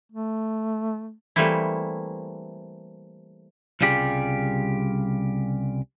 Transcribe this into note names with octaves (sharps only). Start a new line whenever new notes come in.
A3
E3 G3 A3 A#3 C4 E4
C2 C#3 G3 F4 G4 G#4